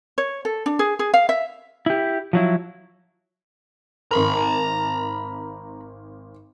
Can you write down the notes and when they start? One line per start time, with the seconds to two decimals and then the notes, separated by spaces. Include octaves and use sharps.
0.18 C#5
0.45 A4
0.66 D4
0.79 G#4
0.99 G#4
1.14 F5
1.29 E5
1.86 E4 G4
2.33 F3 F#3 E4
4.11 G#1 A#4 A#5 B5